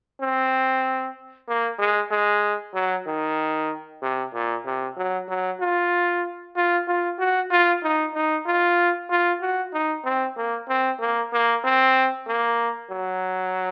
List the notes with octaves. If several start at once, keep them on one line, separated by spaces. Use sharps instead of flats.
C4
A#3
G#3
G#3
F#3
D#3
C3
A#2
C3
F#3
F#3
F4
F4
F4
F#4
F4
D#4
D#4
F4
F4
F#4
D#4
C4
A#3
C4
A#3
A#3
C4
A#3
F#3